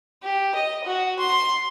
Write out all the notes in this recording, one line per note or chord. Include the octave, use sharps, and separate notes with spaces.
G4
D#5
F#4
C6